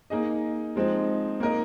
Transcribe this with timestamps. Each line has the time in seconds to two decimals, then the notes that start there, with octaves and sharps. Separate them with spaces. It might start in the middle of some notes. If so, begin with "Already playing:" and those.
0.10 A#3 D#4 G#4 D#5
0.76 F3 G#3 C4 D#4
1.40 A#3 D#4 A#4 D#5